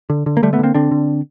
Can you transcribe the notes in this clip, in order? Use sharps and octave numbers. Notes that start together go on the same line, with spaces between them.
D3
D3
A#3
D3 G3 A3
A3 B3
D3 A#3 C4
D3 C4 D4
D3